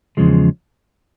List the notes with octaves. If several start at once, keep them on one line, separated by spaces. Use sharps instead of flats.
E2 C#3 F3 G#3